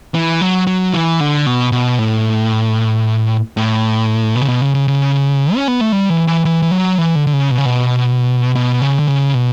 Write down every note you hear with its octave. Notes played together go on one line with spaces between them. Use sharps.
E3
F#3
F#3
E3
D3
B2
B2
A2
A2
B2
C#3
B2
C#3
C#3
C#3
C#4
B3
A3
G3
E3
E3
E3
E3
F#3
E3
D3
D3
C#3
B2
C#3
B2
B2
C#3
D3
C#3
B2